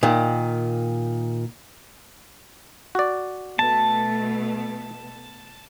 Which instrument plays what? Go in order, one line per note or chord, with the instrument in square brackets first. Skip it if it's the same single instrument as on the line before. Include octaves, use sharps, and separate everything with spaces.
[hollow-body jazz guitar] A#2 D#3
[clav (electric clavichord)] F#4 D5
[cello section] B2 A3 B3 [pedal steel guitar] A5